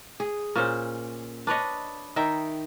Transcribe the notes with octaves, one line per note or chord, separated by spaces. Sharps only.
G#4
A#2 C#4 C5
D4 B4 C#5 D#5
D#3 D#4 E5 G5